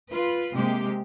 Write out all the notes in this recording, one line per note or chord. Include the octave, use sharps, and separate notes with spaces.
F4 B4
C3 G#3 A#3 G4